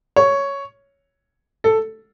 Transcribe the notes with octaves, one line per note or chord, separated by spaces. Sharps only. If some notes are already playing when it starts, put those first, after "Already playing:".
C#5
A4